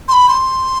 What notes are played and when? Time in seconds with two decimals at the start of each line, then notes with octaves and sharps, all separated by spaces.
0.08 C6
0.13 B5
0.28 C6